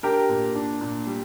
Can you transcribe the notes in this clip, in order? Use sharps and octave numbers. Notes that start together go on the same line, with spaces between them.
D4 G4 A#4
A#2
D4
A#2
G3